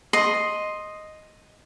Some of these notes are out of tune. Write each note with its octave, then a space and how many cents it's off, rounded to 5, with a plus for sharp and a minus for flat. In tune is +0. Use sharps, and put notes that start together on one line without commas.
D#5 +0 C6 +5